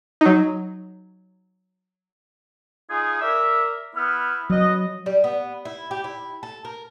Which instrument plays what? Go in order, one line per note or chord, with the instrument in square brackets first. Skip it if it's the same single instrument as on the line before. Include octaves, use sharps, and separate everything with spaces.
[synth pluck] F#3 D#4
[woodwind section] D#4 F4 G#4
A#4 D5 E5
B3 E4 F6
[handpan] F#3 [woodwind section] B3 D#5
[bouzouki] G3
B3
E4
G4
E4
A4
A#4